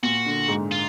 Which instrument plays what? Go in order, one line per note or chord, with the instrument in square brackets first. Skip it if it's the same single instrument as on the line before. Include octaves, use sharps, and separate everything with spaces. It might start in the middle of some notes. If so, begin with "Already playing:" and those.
[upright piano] A#2 [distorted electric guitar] F#4
[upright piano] D3
G#2
[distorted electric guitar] F4